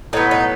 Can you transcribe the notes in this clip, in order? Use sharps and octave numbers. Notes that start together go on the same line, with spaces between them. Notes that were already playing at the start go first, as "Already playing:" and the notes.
A2 F#3 B3 D#4
D#4